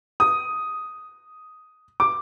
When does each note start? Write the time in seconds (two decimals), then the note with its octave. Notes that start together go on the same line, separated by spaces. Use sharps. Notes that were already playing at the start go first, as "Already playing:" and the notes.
0.20 D#6
2.00 D6